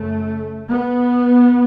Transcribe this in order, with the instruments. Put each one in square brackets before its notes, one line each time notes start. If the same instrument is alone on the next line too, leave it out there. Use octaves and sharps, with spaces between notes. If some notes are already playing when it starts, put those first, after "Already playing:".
Already playing: [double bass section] F#2 C#3 A3
B3